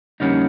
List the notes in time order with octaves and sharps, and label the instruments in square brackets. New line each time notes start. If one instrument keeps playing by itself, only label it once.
[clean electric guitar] F2 D3 G3 A#3 C#4 D#4